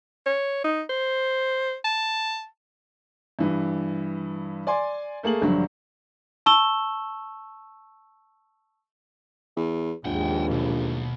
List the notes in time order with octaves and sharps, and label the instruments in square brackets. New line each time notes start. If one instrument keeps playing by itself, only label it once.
[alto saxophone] C#5
D#4
C5
A5
[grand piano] G2 E3
D5 G#5 C6
A3 A#3 G#4 F#7
A#1 G2 D3 F#3
[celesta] A5 C#6 E6 E7 G7
[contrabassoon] E2
[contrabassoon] A#1 [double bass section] D#2 G#2 [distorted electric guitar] F#5 G5
[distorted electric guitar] B1